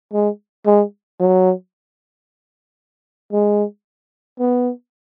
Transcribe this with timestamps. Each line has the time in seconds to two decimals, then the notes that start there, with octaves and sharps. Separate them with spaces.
0.13 G#3
0.66 G#3
1.20 F#3
3.32 G#3
4.39 B3